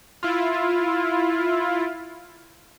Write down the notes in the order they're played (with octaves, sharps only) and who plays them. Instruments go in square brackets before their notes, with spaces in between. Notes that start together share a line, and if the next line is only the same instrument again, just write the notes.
[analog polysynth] E4 F4